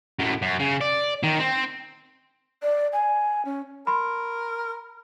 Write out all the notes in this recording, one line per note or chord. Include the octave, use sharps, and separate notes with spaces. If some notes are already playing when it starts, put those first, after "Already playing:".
F#2 A2
F#2
C#3
D5
D#3
C4
D5
G#5
C#4
A#4 B5 C6